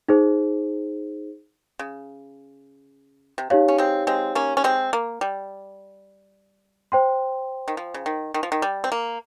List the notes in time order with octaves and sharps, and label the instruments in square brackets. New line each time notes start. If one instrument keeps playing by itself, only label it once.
[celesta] D#4 G#4 C5
[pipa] C#3
C3
[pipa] C#3 [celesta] D#4 G4 C#5 F5
[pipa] C#4
G#3 C4
G#3 C4
A#3 C#4
C#4
G#3 C4
A#3
G3
[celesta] C5 G5 C6
[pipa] D#3
F3
C#3
D#3
D#3
F3
D#3
G3
C4
A#3